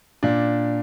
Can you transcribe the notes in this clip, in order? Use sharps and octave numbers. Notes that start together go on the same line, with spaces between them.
A#2 D4